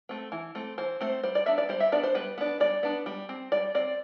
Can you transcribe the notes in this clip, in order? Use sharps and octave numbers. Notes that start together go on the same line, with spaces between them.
A3 C4
E3
A3 C4
E3 C5
A3 C4 C5
G3 C5
D5
B3 D4 E5
D5
G3 C5
E5
B3 D4 D5
C5
G3 B4
B3 D4
G3 D5
B3 D4
G3
C4
G3 D5
C4 D5